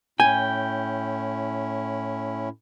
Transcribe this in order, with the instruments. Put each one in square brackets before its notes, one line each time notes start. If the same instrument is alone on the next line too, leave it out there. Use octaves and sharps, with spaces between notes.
[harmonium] A2 C#4 E4 [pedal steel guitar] G5 [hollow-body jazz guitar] G#5